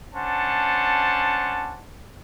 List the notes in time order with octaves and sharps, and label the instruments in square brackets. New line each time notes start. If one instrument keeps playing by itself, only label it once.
[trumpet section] C#4 D4 C5 F#5 A5